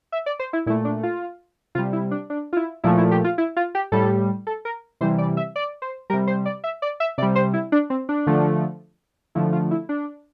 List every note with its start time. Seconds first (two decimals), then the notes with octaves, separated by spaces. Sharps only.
0.12 E5
0.26 D5
0.39 C5
0.53 E4
0.66 A#2 E4
0.70 A3
0.85 D4
1.03 F4
1.75 C3 G3 F4
1.93 E4
2.11 D4
2.30 D4
2.53 F4
2.57 E4
2.84 A#2 F3 A3 E4
2.98 E4
3.11 G4
3.24 F4
3.38 E4
3.57 F4
3.75 G4
3.92 A2 G3 A4
4.47 A4
4.65 A#4
5.01 C3 E3 G3 C5
5.18 D5
5.37 E5
5.56 D5
5.82 C5
6.10 G3 A#4
6.13 C3
6.27 C5
6.46 D5
6.64 E5
6.82 D5
7.00 E5
7.18 C3 D5
7.22 G3
7.35 C5
7.53 E4
7.72 D4
7.90 C4
8.09 D4
8.27 D3 F3 A3
9.35 D3 F3 A3 E4
9.53 F4
9.71 E4
9.89 D4